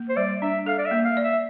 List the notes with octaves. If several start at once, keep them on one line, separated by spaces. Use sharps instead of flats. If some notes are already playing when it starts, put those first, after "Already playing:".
Already playing: A#3
C5
G3 D5
D4 E5
A4 F5
D5
E5
A#3
F5
D5
E5